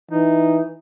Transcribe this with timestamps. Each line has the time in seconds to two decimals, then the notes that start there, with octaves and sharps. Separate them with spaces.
0.11 E3 D#4